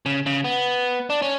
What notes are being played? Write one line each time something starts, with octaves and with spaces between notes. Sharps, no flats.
C#3
C#3
B3
D4
C#4